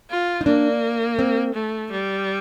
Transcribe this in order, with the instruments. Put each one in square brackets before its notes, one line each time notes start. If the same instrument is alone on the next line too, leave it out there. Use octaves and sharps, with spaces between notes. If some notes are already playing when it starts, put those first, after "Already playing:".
[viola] F4
[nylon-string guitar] D#4
[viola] A#3 [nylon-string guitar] D4
[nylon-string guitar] C4
[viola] A3
G3